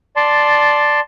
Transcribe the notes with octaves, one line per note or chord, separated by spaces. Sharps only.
D5 A5 C6